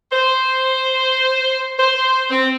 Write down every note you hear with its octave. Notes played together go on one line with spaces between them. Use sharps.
C5
C5
C4